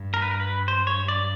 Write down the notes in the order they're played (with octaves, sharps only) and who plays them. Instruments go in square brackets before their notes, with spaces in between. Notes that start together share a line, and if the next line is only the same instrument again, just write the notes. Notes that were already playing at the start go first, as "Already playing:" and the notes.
Already playing: [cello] G2
[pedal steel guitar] A#4
B4
A#4
B4
C5
C#5
D5